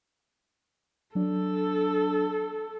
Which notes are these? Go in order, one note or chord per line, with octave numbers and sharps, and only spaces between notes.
F#3 D4 A4